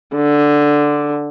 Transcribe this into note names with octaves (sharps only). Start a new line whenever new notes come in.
D3